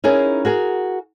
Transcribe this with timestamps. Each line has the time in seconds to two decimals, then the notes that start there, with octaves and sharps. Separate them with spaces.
0.04 C#4 D#4 E4 G#4 A#4
0.45 F#4 G#4 A#4